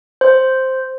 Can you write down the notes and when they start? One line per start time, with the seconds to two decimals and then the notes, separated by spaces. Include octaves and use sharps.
0.21 C5